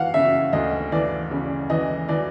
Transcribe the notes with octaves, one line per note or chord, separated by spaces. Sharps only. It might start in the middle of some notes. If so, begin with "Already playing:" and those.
Already playing: E3 F5 F#5
C#3 E5
D2 D#5
E3 D5
C#3
E3 D#5
E3 D5